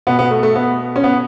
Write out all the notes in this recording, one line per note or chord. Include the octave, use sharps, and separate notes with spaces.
B2 B3
B3
A3
A3
B3
C#4
B3